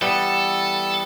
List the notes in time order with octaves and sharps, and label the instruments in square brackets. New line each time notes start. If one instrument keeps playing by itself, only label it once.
[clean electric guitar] E3 G3 B3 [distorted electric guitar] A4